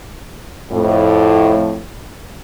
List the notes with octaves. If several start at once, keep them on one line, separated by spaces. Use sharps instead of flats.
F2 A2